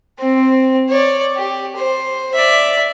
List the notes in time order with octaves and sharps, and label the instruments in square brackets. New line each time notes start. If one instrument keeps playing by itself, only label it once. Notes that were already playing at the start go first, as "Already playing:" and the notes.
[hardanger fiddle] C4
C#5 D5
G4
C5
D5 E5